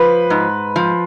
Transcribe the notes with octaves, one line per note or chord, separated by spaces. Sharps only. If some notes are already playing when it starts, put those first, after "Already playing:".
Already playing: F3 B4
G#2
F3